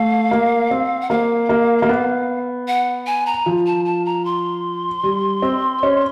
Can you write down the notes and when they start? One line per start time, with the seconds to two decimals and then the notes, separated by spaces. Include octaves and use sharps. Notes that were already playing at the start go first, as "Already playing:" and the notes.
Already playing: A3 F5
0.31 A#3
0.71 C4
1.01 F#5
1.10 A#3 F5
1.49 A#3
1.82 A#3
1.89 B3
2.68 F#5
3.07 G#5
3.26 A#5
3.46 F3
3.66 A5
3.85 A5
4.05 A#5
4.25 C6
5.03 G3
5.42 C4
5.83 C#4